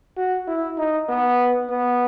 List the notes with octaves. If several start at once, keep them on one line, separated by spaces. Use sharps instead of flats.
F#4
E4
D#4
B3
B3